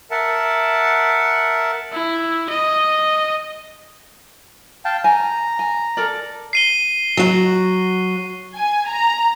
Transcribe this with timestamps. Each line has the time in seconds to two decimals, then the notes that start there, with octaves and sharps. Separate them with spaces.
0.11 A#4 E5 F#5 A5
1.93 E4
2.50 D#5
4.85 F5 G5 A5
5.04 G#5 A#5
5.59 G#5
5.97 A4 A#4 D5
6.53 C7 D#7 G7
7.17 F#3 F#4
8.55 G#5
8.87 A#5